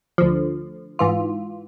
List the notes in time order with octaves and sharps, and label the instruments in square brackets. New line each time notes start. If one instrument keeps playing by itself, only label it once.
[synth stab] D2 D3 F3
G#2 E3 F4